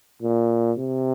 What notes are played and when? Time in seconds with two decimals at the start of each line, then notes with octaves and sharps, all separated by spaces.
0.22 A#2
0.79 C3